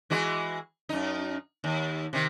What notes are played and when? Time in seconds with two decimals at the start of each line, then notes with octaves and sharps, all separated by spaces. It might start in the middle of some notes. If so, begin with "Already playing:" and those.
0.10 E3 G#3 F#4
0.89 F#2 D#4
1.64 D#2
2.13 C3 D#3